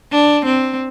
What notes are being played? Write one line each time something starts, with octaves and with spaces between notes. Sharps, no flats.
D4
C4